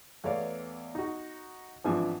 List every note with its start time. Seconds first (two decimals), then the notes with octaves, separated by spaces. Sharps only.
0.24 E2 A3 B3 C#5 D5 F5
0.95 D#4 F#4
1.84 G#1 E3 F3 D4 G#5